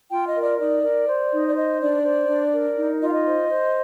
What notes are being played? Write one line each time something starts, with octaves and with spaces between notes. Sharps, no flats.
F4 G5
D#5
A#4
D5
D#4 D5
A#4
C5
D#4
D5
C5 D#5
D4 D5
C5
D4
A#4
D#4
F4 D#5
F5
D#5
C5
C5